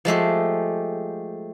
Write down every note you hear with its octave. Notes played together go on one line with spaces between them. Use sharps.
F3 G#3 A3 G4